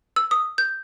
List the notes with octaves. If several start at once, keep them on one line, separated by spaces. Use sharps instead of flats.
E6
D#6
G6